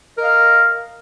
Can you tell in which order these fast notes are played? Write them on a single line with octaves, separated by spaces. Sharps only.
A#4 D#5 F5